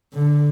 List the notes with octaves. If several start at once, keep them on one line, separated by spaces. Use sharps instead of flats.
D3